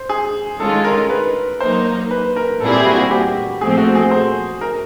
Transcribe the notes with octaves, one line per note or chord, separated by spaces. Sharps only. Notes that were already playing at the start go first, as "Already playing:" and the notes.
Already playing: C5
G#4
D#3 G#3 C#4 F4 A4
A#4
B4
F#3 A#3 D#4 C5
B4
A#4
A#2 G3 C4 E4 G#4 A4
G4
F#4
F#4
G4
A#2 F3 A3 C4 G#4
F#4
G#4
C5
A#4